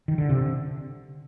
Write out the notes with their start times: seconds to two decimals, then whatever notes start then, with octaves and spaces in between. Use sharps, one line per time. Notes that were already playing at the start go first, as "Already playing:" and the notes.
0.08 D#3
0.18 D3
0.29 C3